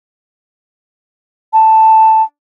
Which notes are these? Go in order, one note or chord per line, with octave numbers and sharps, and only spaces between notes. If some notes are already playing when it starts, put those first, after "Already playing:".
A5